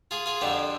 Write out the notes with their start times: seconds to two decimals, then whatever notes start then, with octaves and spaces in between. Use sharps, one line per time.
0.11 F4 G#4
0.26 F4 G#4
0.41 F2 D3 F3 G4